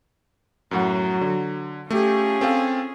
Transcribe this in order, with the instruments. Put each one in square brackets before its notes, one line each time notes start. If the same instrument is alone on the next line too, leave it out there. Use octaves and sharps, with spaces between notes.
[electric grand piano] F#2 A2 F#5 [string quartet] F#3
[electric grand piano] D3
[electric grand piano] A3 G4 [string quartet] C#4 F4 G#4
[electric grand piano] C4 A4 F5